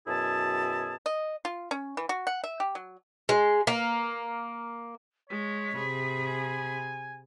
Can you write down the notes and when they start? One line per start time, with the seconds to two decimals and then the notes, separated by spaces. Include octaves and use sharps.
0.07 F#2 B2 E4 G#4 A5
1.06 D#5
1.45 F4
1.71 C#4
1.97 E3
2.09 F#4
2.27 F#5
2.44 E5
2.60 G4
2.75 F#3
3.29 G#3
3.67 A#3
5.30 G#3 C#5 B6
5.75 C3 G#4 B5
6.27 G#5